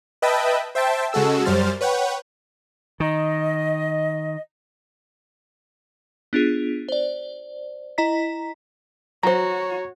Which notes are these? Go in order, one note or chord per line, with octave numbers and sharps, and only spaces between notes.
B4 D#5 E5 G5 A5 B5
C5 E5 G5 A5
C#3 G#3 F#4 A4 E6
F#2 G3 C5 F6 A6
B4 C#5 F#5 G5
D#3 D#5
B3 D4 F4 G#4
C5 D5
E4 D#5 A#5 B6
F#3 F#4 C5 C#5 A#5